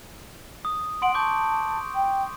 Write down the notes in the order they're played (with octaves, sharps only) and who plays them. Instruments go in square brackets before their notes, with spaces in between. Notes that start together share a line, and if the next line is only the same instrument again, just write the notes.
[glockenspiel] D#6
[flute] F#5 [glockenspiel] C6 D7 F#7
[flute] A5 [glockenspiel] C#6 D6 G6
[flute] G5